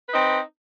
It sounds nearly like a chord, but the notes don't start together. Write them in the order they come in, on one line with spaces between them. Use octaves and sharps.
B4 D#4 C4